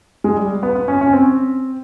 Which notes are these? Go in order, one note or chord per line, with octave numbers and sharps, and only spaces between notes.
G#3
G3
B3
B3
C#4
C#4
C4